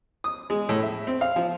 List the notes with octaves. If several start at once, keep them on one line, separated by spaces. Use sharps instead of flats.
D#6
G#3
A2
E5
C4
F5
F3